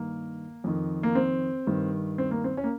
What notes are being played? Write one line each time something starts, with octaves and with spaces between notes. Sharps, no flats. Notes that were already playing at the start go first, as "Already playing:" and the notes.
Already playing: G2 D#3 A#3
F2 D#3
A#3
C4
G2 D#3
C4
A#3
C4
C#4
A#3